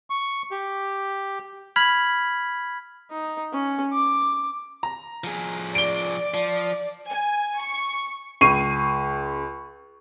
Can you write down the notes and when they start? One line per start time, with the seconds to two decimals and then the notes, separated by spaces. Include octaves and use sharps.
0.10 C#6
0.51 G4
1.76 B5 F6 G#6 B6 F#7
3.10 D#4
3.53 C#4
3.93 D6
4.83 A#5
5.24 F3 G#4
5.75 D5 D7 G7
6.34 F3
7.08 G#5
7.58 C#6
8.41 C#2 C#6 C7 D#7